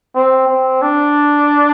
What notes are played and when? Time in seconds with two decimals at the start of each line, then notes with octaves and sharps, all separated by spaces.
0.15 C4
0.49 C4
0.82 D4